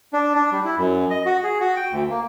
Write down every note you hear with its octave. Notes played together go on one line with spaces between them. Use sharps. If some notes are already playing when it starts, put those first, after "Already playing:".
D4
D4
G3
E4
F#2
D#5
F#4
G#4
F#4
G5
D2
A#3